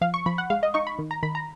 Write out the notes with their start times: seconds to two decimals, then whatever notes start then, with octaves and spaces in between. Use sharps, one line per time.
0.01 F3 F5
0.14 C#6
0.26 F3 B5
0.38 F#5
0.50 G#3 F5
0.63 D#5
0.74 D#4 C#6
0.87 B5
0.99 D#3
1.11 A#5
1.23 D#3 B5
1.35 A#5